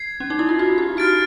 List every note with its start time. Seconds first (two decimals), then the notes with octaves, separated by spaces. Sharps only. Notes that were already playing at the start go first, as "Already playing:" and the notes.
Already playing: G#6 C7
0.20 C#4
0.30 D#4
0.39 E4
0.49 F4
0.59 F#4
0.78 G4
0.97 F#4 F6 A6 D7